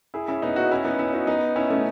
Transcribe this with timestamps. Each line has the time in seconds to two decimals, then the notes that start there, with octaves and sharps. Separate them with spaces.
0.14 E4 G#4
0.28 C#4 E4
0.42 B3 D#4
0.56 D#4 F#4
0.71 C#4 E4
0.85 B3 D#4
0.99 C#4 E4
1.13 D#4 F#4
1.27 B3 D#4
1.56 C#4 E4
1.70 A3 C#4